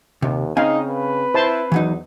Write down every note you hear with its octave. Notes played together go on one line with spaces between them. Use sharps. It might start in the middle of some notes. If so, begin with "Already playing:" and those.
D#2 C3
C#3 C4 D#4 F5 G#5
B4
E4 C5 A5 C6
E2 E3 F#3 D#4